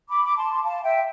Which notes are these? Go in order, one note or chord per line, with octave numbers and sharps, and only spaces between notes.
B5 D6
D6
A5 C6
F5 A5
E5 G5